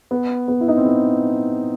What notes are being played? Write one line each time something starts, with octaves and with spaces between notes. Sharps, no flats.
B3
B3
E4
D#4
C4
B3